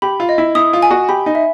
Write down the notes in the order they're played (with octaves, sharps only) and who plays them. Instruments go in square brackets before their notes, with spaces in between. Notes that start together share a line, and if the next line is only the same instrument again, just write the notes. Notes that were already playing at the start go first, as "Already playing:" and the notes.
[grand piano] G4 [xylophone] B5
[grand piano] F4
[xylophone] D#5
[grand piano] E4
[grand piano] E4 [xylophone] D#6
[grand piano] F4
[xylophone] G#5
[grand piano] F#4
[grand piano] G4 [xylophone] B5
[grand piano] D#4
[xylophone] E5